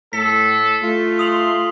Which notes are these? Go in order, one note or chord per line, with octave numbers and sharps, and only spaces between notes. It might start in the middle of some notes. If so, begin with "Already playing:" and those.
A2 A4 B6
A3 F4
C6 D#6 F7 F#7